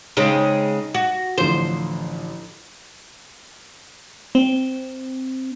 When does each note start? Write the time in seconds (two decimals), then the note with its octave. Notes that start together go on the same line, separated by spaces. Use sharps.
0.17 C#3 G#3 C4 D#4
0.94 F#4
1.38 A1 D3 F3 C5
4.35 C4